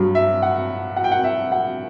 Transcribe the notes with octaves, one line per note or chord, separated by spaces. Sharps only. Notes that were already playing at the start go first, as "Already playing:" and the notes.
Already playing: G2 F#3
E5
F#5
F#5
G5
F#5
E5
F#5